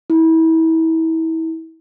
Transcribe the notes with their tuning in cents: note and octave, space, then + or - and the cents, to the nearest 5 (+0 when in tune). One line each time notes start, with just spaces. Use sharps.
E4 -30